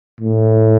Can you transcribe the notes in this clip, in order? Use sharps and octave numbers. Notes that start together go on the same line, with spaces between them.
A2